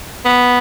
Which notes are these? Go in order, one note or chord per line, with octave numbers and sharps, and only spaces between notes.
B3